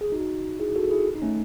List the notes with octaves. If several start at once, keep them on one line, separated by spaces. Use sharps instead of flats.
G#4
D#4 F#4
E4 G#4
F#4 A4
E4 G#4
D#4
A3 C#4